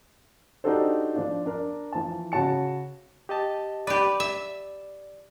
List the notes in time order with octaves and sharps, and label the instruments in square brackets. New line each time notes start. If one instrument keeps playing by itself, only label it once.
[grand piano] D4 D#4 F#4 G4 A4 C5
F3 D4 F4
D4 A#4
E3 F3 A5
C#3 F#4 C#5 A5 C#7
[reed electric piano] G4 D#5 A5
[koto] G4 B4 [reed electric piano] D5
[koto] E5